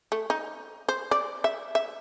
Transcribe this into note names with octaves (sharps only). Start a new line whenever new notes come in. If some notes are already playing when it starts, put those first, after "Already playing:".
A3
D#4
C5
D5
E5
E5